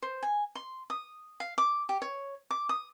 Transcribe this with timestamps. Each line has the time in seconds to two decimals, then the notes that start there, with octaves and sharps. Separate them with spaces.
0.02 C5
0.23 G#5
0.55 C6
0.90 D#6
1.40 F5
1.58 D6
1.89 G4
2.02 C#5
2.50 D6
2.69 D#6